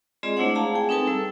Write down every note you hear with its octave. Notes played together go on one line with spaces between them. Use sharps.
G#3 C4 F4 G#4 D5 D#5
A3 D4 E4 C5 C#5 F#5
G#4 F5 A5 A#5
G#4 G5 G#5
C4 D#4 A4 B4 G#5 A5
G3 A4 E6